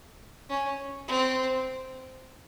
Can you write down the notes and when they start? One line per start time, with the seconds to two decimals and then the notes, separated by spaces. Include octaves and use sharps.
0.49 C#4
1.08 C4